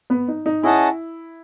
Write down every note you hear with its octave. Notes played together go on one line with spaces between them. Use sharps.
B3
D#4
D#4
C#4 E4 G#4 D#5 F#5 A5